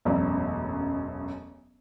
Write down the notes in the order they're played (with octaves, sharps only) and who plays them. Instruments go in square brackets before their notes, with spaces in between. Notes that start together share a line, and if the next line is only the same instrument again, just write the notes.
[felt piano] E1 A1 F#2